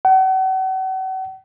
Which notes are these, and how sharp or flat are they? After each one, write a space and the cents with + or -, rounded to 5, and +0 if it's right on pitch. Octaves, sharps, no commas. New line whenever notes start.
F#5 +40